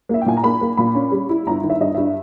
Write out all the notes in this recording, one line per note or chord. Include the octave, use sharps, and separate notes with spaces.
A#3 E5
G5
A#2 G#5
A#5
A#3 B5
A#3
A#2 B5
C#4
G3
E4
G1 A#5
D#3
E5
G2 D#5
G2 E5